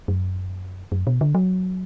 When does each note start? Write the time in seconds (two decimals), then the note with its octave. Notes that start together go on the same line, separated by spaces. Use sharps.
0.08 F#2
0.92 F#2
1.07 B2
1.21 D3
1.35 F#3